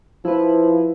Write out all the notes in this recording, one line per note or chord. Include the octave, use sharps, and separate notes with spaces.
F3 E4 B4